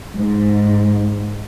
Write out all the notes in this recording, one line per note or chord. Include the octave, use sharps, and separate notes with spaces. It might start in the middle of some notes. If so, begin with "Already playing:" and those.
G#2